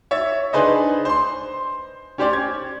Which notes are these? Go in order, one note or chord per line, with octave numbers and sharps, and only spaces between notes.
C#5 E5 A6
D4 D#4 G#4 B4 C5 D#5
C5 C6
C#4 G4 C5 D5
G#6